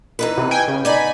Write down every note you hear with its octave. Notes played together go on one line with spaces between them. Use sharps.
E3 D#4 B4
C3
G5 G#5
C#3
B3 D#4 D5 G#5 B5